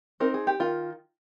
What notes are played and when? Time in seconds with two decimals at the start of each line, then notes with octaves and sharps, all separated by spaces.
0.20 C4 D#4 A#4
0.34 G#4
0.47 G4
0.60 D#3 F4